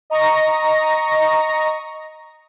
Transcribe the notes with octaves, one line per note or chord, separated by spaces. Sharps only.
D#5 A#5 C#6 A#6